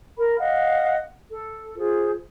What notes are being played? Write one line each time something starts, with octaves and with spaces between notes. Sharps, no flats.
A#4 B5
D#5 F5 F#5
A4
F4 G#4 C5